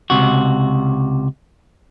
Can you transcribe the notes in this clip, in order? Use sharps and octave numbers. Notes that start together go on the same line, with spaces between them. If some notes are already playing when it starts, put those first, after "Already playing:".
C#2 F#2 C3 F#4